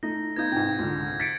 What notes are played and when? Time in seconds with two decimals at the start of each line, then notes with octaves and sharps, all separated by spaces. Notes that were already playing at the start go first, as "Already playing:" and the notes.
0.03 A3 D#4 A#6
0.36 B3 D#4 F4 G6 G#6
0.52 G#2 C3 G5 G#6
0.79 C#2 D3
1.20 A6 B6 C#7 D7